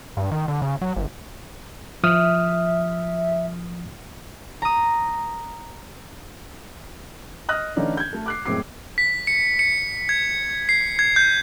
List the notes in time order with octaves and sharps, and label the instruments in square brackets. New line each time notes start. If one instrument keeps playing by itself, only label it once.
[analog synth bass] G2
D#3
D3
C#3
F#3
G1
[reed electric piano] F3 D#6 F6 [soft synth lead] E5
[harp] A#5 D#6
[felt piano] D#5 D#6 F6 F#6 A#6
D3 E3 A3 C#4 D#4 D5
G6 G#6
A3 A4
D6 F#6 C7
F#1 A2 G#3 C4 D6 C7
[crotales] B6
C#7
C#7
G#6
C7
G#6
G6